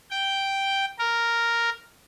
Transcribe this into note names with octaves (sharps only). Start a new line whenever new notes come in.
G5
A#4